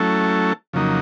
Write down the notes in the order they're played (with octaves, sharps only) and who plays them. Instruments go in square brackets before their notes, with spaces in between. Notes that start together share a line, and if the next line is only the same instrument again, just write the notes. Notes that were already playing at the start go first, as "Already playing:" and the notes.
Already playing: [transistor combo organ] F#3 A3 C#4 E4 A4
F2 C#3 F#3 A#3 D#4